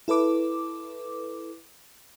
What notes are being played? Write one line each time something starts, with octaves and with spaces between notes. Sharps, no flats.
E4 A4 B4 D6